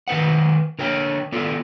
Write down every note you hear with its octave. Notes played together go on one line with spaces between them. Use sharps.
D#3 B4 C5 F#5
D3 A#4 C#5 G5
B3 F4 A4 D5